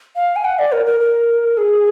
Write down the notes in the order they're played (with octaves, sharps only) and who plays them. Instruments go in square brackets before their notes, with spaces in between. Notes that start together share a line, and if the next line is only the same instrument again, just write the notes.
[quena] F5
G#5
F#5
D5
A#4
A#4
A#4
G#4